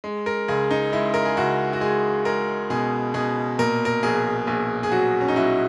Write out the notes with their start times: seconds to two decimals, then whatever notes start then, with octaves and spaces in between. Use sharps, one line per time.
0.04 G#3
0.26 A#4
0.48 C#2 G#4
0.71 D#4
0.92 G#3 E4
1.14 A#4
1.25 G#4
1.37 C#2 F#4
1.73 F#4
1.81 G#3 G#4
2.25 G#3 A#4
2.70 B2 G#4
3.14 B2 G#4
3.59 A#2 A#4
3.85 A#4
4.03 A#1 G#4
4.47 A#1 G#4
4.83 G#4
4.92 F#3 F#4
5.21 C#4
5.28 D#4
5.36 F#3 E4